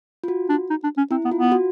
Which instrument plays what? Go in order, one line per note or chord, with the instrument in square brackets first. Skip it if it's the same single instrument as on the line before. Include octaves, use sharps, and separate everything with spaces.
[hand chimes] F4
F#4
[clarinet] D4
D#4
D4
C#4
[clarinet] C4 [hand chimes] E4
[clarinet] B3
[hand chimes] F4
[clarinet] B3
[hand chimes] F#4